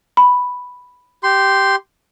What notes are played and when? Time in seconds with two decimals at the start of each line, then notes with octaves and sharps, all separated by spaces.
0.17 B5
1.23 G4 C6